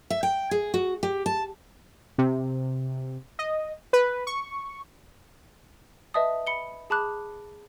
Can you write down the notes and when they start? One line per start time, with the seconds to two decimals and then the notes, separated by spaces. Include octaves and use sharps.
0.10 E5
0.23 G5
0.51 G#4
0.74 F#4
1.03 G4
1.26 A5
2.18 C3
3.39 D#5
3.93 B4
4.27 C#6
6.14 B4 D#5 E5 A5 D#6
6.47 B5 C#7 G7
6.90 G#4 A5 B5 D6 F#6